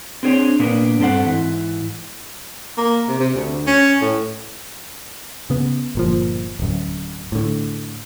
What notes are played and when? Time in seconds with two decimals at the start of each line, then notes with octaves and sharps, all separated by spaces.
0.23 C4 D4 G#4 C5 C#5
0.60 A#2 A#3 B3 D4
0.99 G2 C4 A4 C5 F#5
1.26 G#2 E3
2.77 A#3
3.08 C3
3.20 C3
3.34 D2
3.67 C#4
4.01 A2
5.50 C#3 B3
5.95 G1 A#2 F3
6.60 D1 F#2
7.32 A2 D3